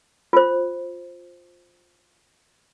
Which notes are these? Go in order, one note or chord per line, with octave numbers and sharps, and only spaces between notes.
F4 C5